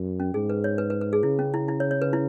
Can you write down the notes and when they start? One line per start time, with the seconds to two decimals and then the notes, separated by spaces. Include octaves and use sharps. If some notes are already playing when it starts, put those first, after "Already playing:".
Already playing: F#2
0.20 C#4
0.34 G#2 G#4
0.50 B4
0.64 C#5
0.78 B4
0.90 B4
1.01 B4
1.13 G#4
1.23 C#3 E4
1.39 C#4
1.54 E4
1.68 E4
1.80 C#5
1.91 C#5
2.02 B4
2.13 E4